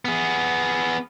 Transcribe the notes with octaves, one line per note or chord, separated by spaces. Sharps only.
B3 G#4